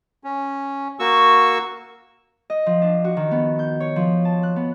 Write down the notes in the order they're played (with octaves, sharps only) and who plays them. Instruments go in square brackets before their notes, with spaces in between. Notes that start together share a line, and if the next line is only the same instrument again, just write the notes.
[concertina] C#4
A#3 F#4 C#6 E6
[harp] D#5
F3
D4
F#4
D#3
B3
G6
C#5
F3
A5
F#6
B3